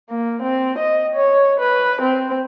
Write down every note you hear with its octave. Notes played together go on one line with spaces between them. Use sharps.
A#3
C4
D#5
C#5
B4
C4